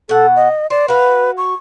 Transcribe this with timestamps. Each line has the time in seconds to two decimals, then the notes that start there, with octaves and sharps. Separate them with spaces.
0.09 B2 A4 F#5
0.36 D#5
0.70 C5 D5
0.88 F#4 B4 F5
1.38 C#6